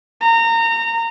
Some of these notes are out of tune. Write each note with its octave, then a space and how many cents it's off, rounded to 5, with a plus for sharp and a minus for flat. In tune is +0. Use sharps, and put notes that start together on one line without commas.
A#5 -25